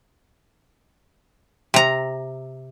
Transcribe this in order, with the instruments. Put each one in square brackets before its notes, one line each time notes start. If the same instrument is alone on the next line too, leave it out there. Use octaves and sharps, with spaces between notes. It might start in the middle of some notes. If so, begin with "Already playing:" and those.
[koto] C3 A#5